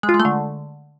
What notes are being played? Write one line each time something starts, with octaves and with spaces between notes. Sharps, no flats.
G#3
F4
G#3
A3
D3